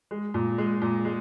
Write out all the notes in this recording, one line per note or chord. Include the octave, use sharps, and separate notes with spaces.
G#3
A#2
G#3
A#2
G#3